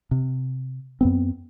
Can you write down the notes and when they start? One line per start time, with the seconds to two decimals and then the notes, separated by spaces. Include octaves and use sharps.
0.11 C3
1.01 F#2 B3 C4